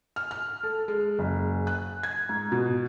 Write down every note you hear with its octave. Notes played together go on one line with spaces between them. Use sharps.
F6
F6
A4
G#3
F#1
F#6
G#6
G#2
B2